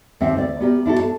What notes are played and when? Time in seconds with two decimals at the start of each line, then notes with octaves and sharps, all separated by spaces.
0.21 D#2 C4 E5 F#5
0.37 D2 D5
0.60 B3 G4 A#4
0.86 D4 E4 F#4 A4
1.00 A5